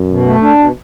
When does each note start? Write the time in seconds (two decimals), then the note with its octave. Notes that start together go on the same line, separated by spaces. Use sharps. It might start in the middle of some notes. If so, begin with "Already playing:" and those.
Already playing: F#2
0.10 B2
0.26 A3
0.42 D4
0.59 B2